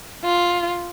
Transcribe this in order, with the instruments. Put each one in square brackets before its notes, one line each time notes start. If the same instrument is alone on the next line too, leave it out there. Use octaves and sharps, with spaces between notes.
[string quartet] F4